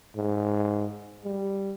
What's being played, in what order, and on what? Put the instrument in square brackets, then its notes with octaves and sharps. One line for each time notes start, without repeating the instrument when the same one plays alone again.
[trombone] G#2
G3